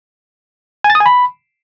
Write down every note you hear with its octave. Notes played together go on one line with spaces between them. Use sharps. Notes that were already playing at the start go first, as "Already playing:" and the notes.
G#5
A6
D#6
G#5
B5